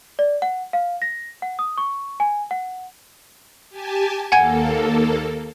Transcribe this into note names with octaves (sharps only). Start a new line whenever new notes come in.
D5
F#5
F5
A#6
F#5
D#6
C#6
G#5
F#5
G4 G#5 A5
D#2 A#3 A4 F#5 G#5 G#6